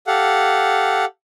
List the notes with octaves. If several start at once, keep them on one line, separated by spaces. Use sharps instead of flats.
G4 A4 F5 F#5